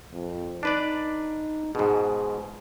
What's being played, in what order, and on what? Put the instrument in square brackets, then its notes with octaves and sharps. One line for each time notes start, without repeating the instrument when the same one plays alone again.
[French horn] F2
[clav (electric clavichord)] D4 B4 D5 [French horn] D#4
[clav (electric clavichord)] G#2 B2 [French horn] G#4